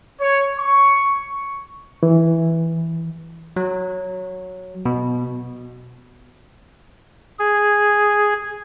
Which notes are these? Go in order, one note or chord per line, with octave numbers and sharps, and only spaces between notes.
C#5
C#6
E3
F#3
B2
G#4